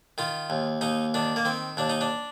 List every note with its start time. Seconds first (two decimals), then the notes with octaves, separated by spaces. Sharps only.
0.18 D#3 F4
0.50 D#2
0.81 D#2 D#4
1.14 D#3 D4
1.36 A#3
1.45 D#3 C4
1.77 D#2 D4
1.90 D#4
2.01 D4